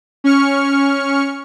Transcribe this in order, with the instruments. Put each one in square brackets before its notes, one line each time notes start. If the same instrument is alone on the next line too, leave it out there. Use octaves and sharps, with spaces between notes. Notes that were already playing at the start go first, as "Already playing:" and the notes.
[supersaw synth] C#4 C#6 F6 C#7